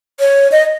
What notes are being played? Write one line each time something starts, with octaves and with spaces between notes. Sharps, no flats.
C#5
D#5